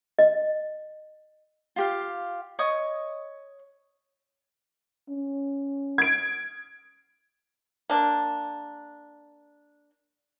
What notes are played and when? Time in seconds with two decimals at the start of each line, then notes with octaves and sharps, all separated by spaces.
0.19 D#5
1.76 F4 G4 F5
2.59 C#5 D#5 C#6 D#6
5.09 C#4
5.98 G#6 D7
7.90 A#3 D4